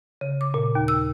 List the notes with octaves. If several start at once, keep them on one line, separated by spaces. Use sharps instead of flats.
C#3
D6
A#2
D#2
E6